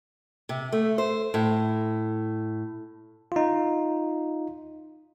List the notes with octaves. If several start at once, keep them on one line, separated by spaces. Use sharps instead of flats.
C3
A3
C5
A2
D#4 F4